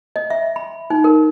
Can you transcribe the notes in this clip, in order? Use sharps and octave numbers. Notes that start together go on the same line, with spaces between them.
D#5
E5
B5
D#4
A#4